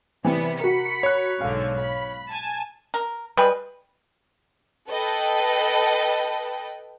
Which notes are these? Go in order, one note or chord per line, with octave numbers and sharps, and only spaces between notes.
C3 E3 G3 B3 C4
F#4 A#4 B5 B6 C#7
C#5 F#6
B1 G#2 D3 F5
B5
G#5 A5
A#4
G3 G#3 B4
A4 B4 D#5 G5